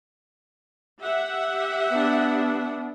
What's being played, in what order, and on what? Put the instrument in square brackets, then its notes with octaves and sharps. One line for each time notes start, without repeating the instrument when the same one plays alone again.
[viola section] G4 E5 F#5
[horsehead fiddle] B3 D4